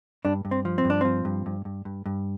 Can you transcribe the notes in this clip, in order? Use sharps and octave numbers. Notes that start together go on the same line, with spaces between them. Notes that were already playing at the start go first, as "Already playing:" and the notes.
G2 D4
G2
C4
F3
C4
G2
D4
F3 C4
G2
G2
G2
G2
G2